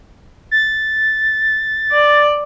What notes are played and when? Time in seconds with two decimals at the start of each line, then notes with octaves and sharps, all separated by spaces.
0.51 A6
1.92 D5